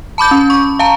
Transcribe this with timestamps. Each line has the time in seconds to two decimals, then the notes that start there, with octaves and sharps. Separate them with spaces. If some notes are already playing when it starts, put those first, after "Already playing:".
0.18 A5 B5 D6 G6
0.31 C#4
0.50 C#6
0.79 F5 A5 A#5